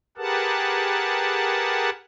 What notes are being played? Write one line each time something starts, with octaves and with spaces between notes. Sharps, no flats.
G4 G#4 A#4 B4 F#5 A5